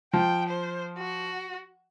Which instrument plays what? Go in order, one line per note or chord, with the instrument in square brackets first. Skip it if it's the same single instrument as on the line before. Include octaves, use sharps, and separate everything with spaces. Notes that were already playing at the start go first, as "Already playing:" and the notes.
[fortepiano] F3 [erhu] G5
[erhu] C5
F#4